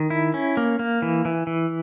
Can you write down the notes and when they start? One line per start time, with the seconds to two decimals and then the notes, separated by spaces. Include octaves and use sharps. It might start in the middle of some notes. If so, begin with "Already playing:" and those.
Already playing: D#3
0.10 E4
0.34 C#4
0.57 A#3
0.79 A#3
1.02 E3
1.25 E3
1.47 E3